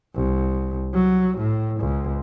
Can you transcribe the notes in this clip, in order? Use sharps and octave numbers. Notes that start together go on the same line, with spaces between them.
C2
F#3
A2
C#2